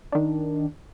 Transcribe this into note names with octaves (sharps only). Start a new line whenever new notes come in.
D#3 D4